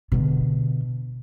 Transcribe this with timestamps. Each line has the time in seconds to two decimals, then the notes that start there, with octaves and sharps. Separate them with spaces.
0.12 B2 D3